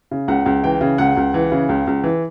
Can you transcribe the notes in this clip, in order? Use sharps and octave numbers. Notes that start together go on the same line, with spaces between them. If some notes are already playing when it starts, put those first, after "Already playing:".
C#3
C#2 F#5
C#2
E3 G5
C#3
C#2 F#5
C#2
E3
C#3
C#2
C#2
E3